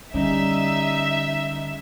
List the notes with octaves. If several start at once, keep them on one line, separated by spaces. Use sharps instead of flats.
D3 G3 C#4 D#4 E5